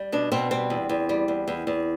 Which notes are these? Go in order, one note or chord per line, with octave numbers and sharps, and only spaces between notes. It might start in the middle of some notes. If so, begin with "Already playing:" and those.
Already playing: G3
B2 D4
B2 C4
G3 C4
E2
E2
G3
E2
E2
E2